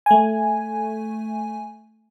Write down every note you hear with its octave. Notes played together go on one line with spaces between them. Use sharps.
A3 G#5